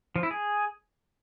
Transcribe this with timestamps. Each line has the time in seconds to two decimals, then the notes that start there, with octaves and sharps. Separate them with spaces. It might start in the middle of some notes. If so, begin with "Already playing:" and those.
0.16 F3
0.23 E4
0.31 G#4